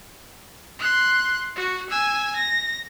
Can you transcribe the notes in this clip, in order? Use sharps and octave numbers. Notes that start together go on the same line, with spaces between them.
C6 F#6
F#4
G#5 E6
A#6